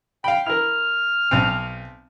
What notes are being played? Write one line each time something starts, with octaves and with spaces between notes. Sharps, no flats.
F5 G5 B5
E4 A#4 F6
B1 C4